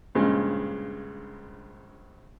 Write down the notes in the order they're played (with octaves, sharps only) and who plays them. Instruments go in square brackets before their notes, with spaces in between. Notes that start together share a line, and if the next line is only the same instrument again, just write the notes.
[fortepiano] A#1 G2 C#3 G#3